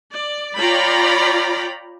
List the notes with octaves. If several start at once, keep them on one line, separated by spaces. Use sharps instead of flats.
D5
F4 C#5 D5 G5 A#5 B5